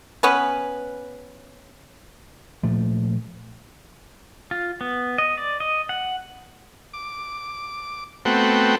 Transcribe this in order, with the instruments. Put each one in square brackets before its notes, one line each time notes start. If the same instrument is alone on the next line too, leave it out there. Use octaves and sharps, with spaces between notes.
[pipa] B3 C#4 B4
[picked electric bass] A#2 F3 A3
[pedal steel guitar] F4
B3
D#5
D5
D#5
F#5
[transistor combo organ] D6
A3 B3 C4 F#4 G5